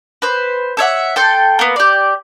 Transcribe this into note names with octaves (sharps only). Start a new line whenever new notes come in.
B4 C5
A4 C#5 E5 F#5
A4 G5 C6
A#3 B3
G4 D5